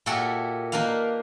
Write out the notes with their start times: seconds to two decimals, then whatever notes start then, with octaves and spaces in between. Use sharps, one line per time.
0.06 A#2 E4 F#4 G4 A4 F#5
0.72 A#3 D4 D#4 B4 F5